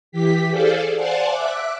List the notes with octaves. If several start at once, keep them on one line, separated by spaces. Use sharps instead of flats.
E3 G4 B6
G#4 A4 C5 D5 F5
C5 D5 F5 F#5 G#5 A5
E5 D6 F#6